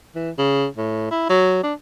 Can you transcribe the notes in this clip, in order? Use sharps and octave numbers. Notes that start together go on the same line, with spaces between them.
E3
C#3
A2
E4
F#3
D4